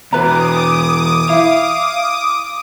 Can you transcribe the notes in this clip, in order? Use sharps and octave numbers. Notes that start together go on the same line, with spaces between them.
E2 B2 F#4 B4 A#5 D6 D#6
E4 F5